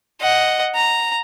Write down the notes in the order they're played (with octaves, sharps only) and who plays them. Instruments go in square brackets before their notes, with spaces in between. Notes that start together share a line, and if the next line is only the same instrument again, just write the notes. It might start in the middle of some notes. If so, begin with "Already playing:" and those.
[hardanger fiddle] D#5 F#5
A#5